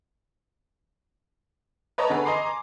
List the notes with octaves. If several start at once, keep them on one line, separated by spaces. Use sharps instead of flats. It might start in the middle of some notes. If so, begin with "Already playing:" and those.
B4 C#5 D#5 A5 A#5 C#6
D3 B3 G#4 B4
D#5 G#5 A#5 C6 D6 C7
D6